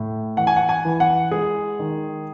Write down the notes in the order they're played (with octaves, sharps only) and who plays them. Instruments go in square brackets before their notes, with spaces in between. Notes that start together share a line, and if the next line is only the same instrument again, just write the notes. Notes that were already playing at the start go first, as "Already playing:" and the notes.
Already playing: [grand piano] A2
E3 F#5
G#5
F#5
G#5
E3
F#5
G#3 G#4
D#3